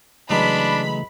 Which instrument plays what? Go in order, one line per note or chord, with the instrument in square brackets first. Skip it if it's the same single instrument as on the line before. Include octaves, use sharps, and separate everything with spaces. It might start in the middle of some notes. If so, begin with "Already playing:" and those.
[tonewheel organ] C#3 E3 A3 [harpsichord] F#3 G#3 B3 [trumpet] D4 [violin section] B5